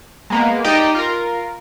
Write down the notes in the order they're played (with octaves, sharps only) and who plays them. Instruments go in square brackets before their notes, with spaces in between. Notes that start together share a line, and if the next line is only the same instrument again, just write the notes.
[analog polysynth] G#3 A#3 B3
D#4 G4 D5 D#5 G5
F4 A#4